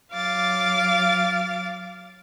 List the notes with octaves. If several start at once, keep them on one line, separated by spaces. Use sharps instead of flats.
F#3 F5 D6 A6